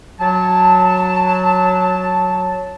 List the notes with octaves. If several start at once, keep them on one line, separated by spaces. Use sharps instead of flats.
F#3 A5